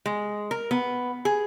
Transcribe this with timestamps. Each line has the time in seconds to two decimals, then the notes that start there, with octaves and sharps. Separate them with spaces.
0.06 G#3
0.51 A#4
0.71 B3
1.25 G#4